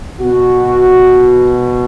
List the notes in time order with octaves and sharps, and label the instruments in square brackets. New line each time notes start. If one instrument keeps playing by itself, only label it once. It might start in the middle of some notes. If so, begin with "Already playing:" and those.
[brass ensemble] B2 F#4